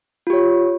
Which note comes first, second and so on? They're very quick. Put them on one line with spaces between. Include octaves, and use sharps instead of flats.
F4 G4 C#5